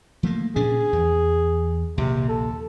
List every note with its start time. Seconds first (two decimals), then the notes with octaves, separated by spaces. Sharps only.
0.23 F3 A3 A#3
0.56 A#2 C#4 D4 G#4
0.93 E2
1.98 A#1 D#2 C3
2.29 A4